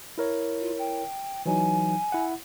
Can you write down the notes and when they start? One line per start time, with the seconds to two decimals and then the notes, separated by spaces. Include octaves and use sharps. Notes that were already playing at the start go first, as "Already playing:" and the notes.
0.18 E4 A#4 C#5
0.60 F4
0.79 G5
1.46 E3 F#3 D#4 G#5
2.12 E4 F#5